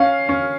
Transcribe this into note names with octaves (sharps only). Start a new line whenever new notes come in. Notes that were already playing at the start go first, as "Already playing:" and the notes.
Already playing: C#4 F5
C#4